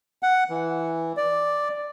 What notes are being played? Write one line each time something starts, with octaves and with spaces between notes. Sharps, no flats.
F#5
E3
D5